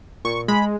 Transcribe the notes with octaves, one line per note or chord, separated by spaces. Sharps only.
A#2 C#6
G#3 B5